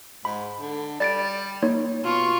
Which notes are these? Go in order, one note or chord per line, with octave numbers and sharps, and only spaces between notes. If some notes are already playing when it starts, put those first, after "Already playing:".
G#2 B5
D3
G3 D5 A6 D7
A#3 D#4 C#5
B2 F4 C#6